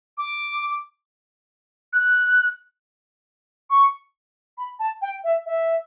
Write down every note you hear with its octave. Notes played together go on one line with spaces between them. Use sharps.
D6
F#6
C#6
B5
A5
G5
E5
E5